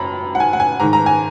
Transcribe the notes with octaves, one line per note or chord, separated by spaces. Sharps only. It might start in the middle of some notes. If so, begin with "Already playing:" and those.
Already playing: F#2 A#5 B5
F#5
G#5
F#5
G#5
G#2 D#3 A#5
A#5
G#5